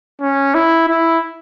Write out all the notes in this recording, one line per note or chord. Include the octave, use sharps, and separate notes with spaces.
C#4
E4
E4